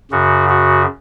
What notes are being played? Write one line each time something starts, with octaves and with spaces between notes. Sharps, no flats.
F#2 C#3 F#4
F#4